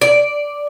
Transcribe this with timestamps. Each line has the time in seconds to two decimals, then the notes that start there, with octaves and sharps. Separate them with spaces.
0.01 D5